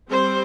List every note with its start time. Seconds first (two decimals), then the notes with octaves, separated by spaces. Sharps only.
0.10 G3 C4 C5